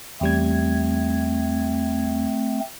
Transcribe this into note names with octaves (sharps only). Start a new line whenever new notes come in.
E2 G3 A3 C4 G#6